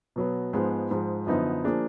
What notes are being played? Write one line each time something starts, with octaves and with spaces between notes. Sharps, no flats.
B2 F#3 B3
G#2 F3 G#3 B3
G#2 F3 G#3
F#2 D3 F3 B3 D#4
F3 A#3 D4 G#4